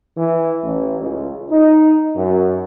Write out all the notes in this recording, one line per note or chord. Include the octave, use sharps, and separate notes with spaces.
E3
A1
C#2
D#4
F#2